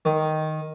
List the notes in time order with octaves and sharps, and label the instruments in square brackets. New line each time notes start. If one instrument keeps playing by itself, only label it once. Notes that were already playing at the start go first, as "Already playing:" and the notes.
[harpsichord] D#3